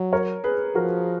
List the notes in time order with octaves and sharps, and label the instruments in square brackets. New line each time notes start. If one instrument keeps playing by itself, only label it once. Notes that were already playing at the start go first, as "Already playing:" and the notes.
Already playing: [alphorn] F#3
[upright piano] A#4 C#5
G#4 B4
[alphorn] F3 [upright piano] F#4 A#4